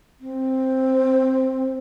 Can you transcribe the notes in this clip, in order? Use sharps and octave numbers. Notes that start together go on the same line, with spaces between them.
C4